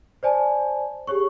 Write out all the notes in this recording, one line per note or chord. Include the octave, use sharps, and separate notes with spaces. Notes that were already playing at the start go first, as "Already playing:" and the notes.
C5 D5 G#5 A5
G4 G#4 C#5 C#6